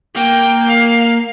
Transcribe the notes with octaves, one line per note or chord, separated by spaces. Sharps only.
A#3 G5
F5